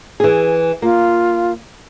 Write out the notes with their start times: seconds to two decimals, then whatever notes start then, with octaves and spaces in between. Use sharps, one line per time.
0.20 E3 G#4
0.82 A#3 F4